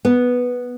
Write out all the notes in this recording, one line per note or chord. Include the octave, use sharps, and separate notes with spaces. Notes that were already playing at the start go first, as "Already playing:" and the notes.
B3